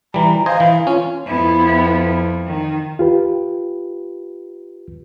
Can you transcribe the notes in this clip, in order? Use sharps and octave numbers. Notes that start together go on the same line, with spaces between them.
E3 G3 A#5
C5 D#5 F5 G#5
E3
C#4 F4
F2 B3 E4
D#3
F4 G4 B4